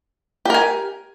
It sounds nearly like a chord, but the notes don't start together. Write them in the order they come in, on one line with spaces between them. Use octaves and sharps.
G4 A#4 G#5